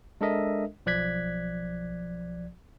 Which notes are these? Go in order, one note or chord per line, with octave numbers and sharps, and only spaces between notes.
G#3 D4 A4 A#4 D#5 E5
B1 F3 D5 F#6 G#6 B6